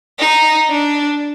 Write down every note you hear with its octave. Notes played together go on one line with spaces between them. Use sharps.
D#4
D4